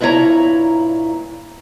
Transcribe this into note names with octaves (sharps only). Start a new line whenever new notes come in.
G2 A#2 E4 F4 C#5 A#5